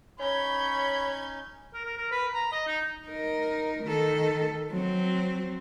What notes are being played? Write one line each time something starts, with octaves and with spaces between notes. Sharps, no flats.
C#4 D#4 C#5 B5 G6 G#6
A#4
A#4
A#4
B4
A#5
D#5
D#4
D#4 A#4
D#3 A4
F#3 C4